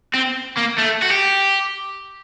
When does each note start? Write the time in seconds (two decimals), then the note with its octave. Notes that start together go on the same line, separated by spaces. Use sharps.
0.14 C4
0.57 A#3
0.78 A3
1.02 F#4
1.10 G4